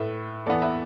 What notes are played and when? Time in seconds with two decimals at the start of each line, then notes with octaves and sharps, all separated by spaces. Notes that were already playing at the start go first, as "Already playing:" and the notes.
Already playing: A2 A3 B4 E5
0.46 E2 E3 B3 A4 D5
0.62 B4 E5